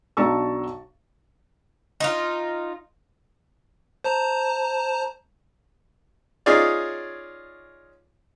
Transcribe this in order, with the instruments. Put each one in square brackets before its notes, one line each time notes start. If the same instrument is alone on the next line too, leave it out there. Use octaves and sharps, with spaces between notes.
[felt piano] B1 D4 A5 A#5 C#6 E6
[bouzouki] D#4 F4
[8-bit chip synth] C5 A5 A#5
[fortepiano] C#4 D#4 F4 G#4 C#5 D5